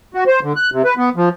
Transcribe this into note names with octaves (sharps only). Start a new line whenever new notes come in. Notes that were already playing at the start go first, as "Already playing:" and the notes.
F#4
C5
D3
F#6
C3
B4
B3
F3